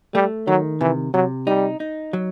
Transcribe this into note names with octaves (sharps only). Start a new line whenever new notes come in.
G3 A3
D#3 F#3
C3 E3
C3 F#3
G3 D#4
D#4
F#3